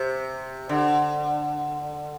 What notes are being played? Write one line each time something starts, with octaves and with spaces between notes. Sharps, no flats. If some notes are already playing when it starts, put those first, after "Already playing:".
Already playing: C3
D3